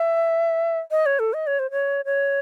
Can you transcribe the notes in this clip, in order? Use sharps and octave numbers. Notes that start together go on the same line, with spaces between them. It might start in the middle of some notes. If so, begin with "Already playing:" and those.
Already playing: E5
D#5
C#5
A4
D#5
C#5
C5
C#5
C#5